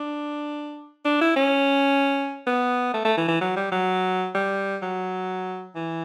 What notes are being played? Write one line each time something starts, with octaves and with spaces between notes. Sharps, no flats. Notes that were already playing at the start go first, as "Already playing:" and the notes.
Already playing: D4
D4
E4
C#4
B3
A3
A3
E3
E3
F#3
G3
F#3
G3
F#3
E3